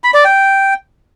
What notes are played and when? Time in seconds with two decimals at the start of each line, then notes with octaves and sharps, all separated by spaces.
0.04 B5
0.14 D5
0.25 G5